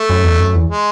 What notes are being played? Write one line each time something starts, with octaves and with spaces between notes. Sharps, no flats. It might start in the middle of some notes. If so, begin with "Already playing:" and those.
Already playing: A3
F#2
E2
F#2
E2
G#3